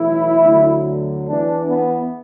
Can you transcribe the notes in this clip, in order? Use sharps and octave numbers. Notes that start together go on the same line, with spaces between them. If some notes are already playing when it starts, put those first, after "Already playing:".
Already playing: B1 A2 E3 E4
D2 D3 F#3
E2 E3 D4
B3